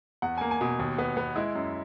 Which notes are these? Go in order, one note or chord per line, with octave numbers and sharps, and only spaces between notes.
E2 F#5
A#3 G#5
G#5
B2
D#2
B3
B3
G#3 E4
F#2